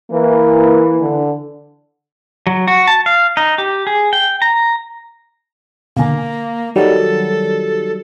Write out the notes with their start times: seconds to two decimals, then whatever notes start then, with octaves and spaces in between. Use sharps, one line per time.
0.11 E3 A#3
1.00 D3
2.47 F#3
2.68 F#4
2.87 A5
3.06 F5
3.37 D#4
3.58 G4
3.87 G#4
4.13 G5
4.42 A#5
5.97 B2 D3 A#3
6.76 D#3 F#3 G3 A4